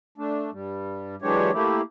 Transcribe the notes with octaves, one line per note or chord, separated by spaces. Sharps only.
A3 D4
G2 G3
E3 F#3 G#3 D4 G4 C#5
A3 A#3 E4 G4